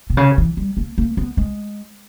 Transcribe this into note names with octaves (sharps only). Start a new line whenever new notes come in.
B2
C#3
E3
G3
A#3
A#3
B3
G#3